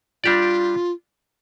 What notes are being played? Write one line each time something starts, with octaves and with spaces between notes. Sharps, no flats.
G3 D4 F4 G4 D5